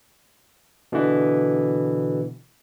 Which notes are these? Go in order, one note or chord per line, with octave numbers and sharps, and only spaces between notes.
B2 D3 E3